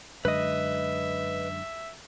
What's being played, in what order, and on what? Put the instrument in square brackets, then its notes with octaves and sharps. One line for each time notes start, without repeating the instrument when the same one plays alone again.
[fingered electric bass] F#2 D3 G#3 [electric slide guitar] B4 D#5 [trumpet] E5